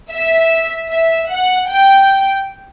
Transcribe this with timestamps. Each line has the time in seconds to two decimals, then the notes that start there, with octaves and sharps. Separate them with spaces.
0.11 E5
0.90 E5
1.29 F#5
1.69 G5